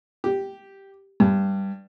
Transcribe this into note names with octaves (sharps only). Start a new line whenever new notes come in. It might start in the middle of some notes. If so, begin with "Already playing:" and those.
G4
G2